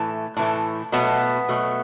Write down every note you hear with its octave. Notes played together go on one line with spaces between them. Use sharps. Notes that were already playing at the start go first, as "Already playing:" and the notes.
Already playing: A2 E3 A3
A2 E3 A3
B2 F#3 A3 B3
B2 F#3 A3